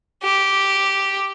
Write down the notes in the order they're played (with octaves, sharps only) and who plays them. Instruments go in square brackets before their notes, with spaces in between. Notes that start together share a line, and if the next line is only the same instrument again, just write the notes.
[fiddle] G4